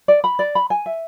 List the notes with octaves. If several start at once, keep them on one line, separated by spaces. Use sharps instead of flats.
D5
B5
D5
B5
G#5
E5